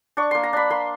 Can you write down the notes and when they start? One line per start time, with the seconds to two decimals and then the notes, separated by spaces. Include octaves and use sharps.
0.17 D4 C#6
0.31 A#3 C6
0.43 A#5
0.53 D4 B5
0.70 A#3 C6